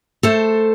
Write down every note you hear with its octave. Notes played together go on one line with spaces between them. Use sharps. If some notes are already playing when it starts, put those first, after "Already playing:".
A3 A4 C5